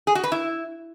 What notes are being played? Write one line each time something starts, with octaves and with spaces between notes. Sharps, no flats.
G#4
F#4
B4
E4